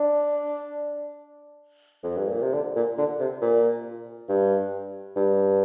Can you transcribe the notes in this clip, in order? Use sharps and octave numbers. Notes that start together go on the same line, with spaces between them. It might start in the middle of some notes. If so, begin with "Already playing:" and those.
Already playing: D4
F2
G2
A#2
C3
D3
A#2
D3
C3
A#2
G2
G2